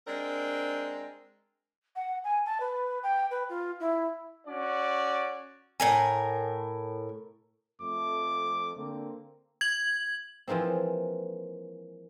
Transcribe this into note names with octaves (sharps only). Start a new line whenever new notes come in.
G#3 C4 D4 A#4
F#5
G#5
A5
B4
G5
B4
F4
E4
C#4 F#4 D5
A2 A#4 G#5
F2 A3 D6
D3 A#3 C4
G#6 F#7
E3 F3 G#3 A#3 C4